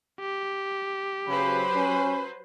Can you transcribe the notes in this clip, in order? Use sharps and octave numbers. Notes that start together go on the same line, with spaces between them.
G4
C#3 F#3 B4 C5 B5
C#4